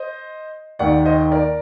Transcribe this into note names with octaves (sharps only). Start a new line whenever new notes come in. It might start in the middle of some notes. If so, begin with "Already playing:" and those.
Already playing: C5 D#5
D#2 D#3 D5 F#5
C5 D#5
A#4 D5